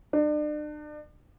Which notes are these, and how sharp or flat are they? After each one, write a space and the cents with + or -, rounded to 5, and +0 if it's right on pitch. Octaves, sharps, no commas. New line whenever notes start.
D4 +35